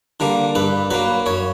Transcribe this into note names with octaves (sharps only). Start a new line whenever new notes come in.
D3 G3 A#3
G2 B4
F#3 A#3 B4
F#2 C#5